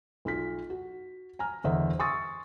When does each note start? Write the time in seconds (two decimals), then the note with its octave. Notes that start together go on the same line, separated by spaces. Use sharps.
0.25 B1 F4 B6
0.70 F#4
1.39 G#5 A#5 F6
1.64 G1 E2 C5 D#5 E5 F#5
1.99 G#5 C6 C#6 D#6 E6 A6